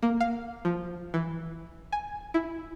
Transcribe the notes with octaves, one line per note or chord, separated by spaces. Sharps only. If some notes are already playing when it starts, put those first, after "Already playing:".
A#3
F5
F3
E3
G#5
E4